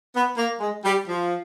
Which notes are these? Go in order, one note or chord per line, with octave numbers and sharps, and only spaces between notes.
B3
A#3
G#3
G3
F3